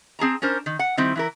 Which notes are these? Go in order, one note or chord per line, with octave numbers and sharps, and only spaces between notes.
C4 G#4 A5 A#5
C#4 D4 A#4 C5
D#3
F#5
D#3 G3 C4 E4
E3 E4 A#4